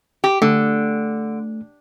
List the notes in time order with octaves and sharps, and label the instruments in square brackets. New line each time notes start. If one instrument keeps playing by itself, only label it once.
[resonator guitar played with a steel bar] G4
[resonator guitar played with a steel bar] D3 [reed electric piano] A3